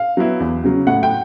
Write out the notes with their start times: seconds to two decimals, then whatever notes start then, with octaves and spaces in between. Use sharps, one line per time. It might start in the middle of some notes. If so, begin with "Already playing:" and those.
Already playing: F5
0.17 F#3 B3 E4
0.40 E2
0.64 C#3 F#3
0.87 A2 F#5
1.03 G5